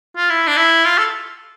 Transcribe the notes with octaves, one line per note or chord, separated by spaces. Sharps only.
F4
E4
D4
E4
F4
A4